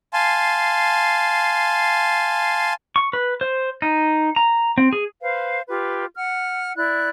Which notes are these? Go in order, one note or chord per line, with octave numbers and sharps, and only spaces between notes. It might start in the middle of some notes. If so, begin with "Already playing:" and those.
F5 G#5 A5 C6
C#6
B4
C5
D#4
A#5
C4
G#4
B4 C5 F5
F4 G4 B4
F#5 F6
E4 D5 F#6